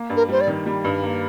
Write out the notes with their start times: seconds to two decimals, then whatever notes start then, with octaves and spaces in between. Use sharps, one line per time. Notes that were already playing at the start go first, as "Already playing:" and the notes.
Already playing: A#3
0.10 G2
0.16 A#4
0.28 G3 C5
0.41 D5
0.48 D#3
0.66 G3
0.85 G2
1.03 A#3